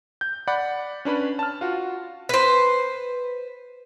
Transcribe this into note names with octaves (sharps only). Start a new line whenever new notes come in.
G6
D5 F#5 B5
C#4 D4 B4 B5
A5 F6
F4 F#4
B4 C5